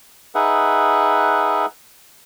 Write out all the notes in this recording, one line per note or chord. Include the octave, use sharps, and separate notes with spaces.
D#4 G#4 B4 E5 F#5